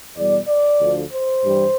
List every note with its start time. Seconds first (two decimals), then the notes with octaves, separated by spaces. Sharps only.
0.16 E2 B2 G3 D5
0.48 D5
0.81 D2 D3 F3
1.13 C5
1.44 G2 E3 G3